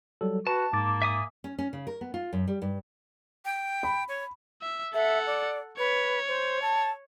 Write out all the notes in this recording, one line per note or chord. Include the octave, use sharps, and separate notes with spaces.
F#3 G3 A4
F#4 B4 A5
G#2 A#3 D6 A6
E5 G#5 D#6
C#4
C#4
C#3
A#4
B3
F4
F#2
G3
G2
G5
B5
C#5
E5
A4 E5 F#5
D5
B4 C#5
C5
A5